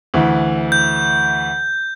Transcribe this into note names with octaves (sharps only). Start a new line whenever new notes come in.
D2 E3
G6